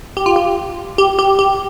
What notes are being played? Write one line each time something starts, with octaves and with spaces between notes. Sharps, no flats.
G4
F4
G4
G4
G4
G4